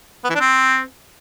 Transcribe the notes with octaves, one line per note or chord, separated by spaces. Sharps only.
B3
E3
D4
C4